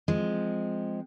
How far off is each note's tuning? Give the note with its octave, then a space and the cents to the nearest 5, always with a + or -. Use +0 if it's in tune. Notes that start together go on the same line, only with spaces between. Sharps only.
F3 -5 G#3 +0 C4 +0